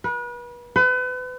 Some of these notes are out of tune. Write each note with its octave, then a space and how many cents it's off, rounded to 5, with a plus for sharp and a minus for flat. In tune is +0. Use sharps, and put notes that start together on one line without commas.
B4 -35
B4 +35